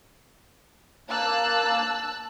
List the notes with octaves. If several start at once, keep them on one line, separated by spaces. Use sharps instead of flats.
A#3 A5 E6 F#6